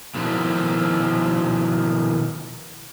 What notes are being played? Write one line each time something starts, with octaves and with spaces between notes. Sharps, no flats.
B2 D#3 F3 G3 E4 F#4